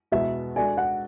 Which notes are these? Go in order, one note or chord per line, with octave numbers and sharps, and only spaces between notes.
E2 B2 G#3 B3 F#4 E5
G#3 D4 F#4 A4 D5 G#5
F#5